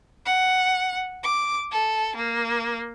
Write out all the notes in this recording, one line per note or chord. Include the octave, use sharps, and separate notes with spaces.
F#5
D6
A4
A#3